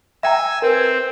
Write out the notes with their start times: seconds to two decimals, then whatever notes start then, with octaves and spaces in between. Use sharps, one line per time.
0.23 E5 G5 G#5 A#5 E6
0.62 C4 A#4 B4